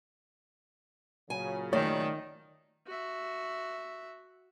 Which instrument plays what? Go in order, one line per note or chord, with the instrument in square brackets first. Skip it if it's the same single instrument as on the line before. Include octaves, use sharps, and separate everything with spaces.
[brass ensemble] A#2 C#3 F#3 [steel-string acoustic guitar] G#5
[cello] D#3 [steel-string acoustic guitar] A3 D5 [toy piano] C#5
[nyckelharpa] F#4 E5